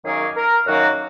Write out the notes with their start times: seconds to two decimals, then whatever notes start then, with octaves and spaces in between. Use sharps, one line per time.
0.05 F#2 D#3 F#3 A#3 C#4 G#4
0.36 A#4
0.66 F#2 D#3 F#3 A#3 C#4 F#4